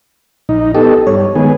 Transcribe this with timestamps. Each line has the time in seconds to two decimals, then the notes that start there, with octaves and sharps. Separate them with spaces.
0.49 A#1 D#4
0.75 B3 D#4 G4 A4
1.07 G2 C#5
1.35 D#3 G#3 B3 G#4